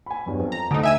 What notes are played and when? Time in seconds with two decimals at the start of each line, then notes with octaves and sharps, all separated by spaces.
0.06 G#5 B5
0.26 E2 G2 F#3
0.40 F2
0.52 A#5
0.71 D2 D3 D#4 D#6 D7
0.83 E5 G#5 E6